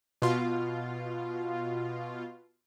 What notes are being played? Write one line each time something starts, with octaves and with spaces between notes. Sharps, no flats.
B2 F4